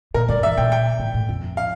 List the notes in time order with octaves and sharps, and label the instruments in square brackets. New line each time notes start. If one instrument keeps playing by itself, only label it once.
[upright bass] A#2 [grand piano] A#4
[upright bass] G2 [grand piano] D5
[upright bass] E3 [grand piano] E5
[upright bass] A#2 [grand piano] G5
[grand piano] G5
[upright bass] A2
A2
F2
[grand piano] F5